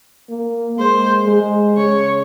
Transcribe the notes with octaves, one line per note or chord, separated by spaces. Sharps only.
A#3
G#3 C5
G#3
C#3 C#5